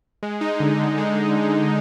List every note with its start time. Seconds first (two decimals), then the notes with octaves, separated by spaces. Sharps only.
0.23 G#3
0.41 D#4
0.60 D3
0.79 D3
0.98 G#3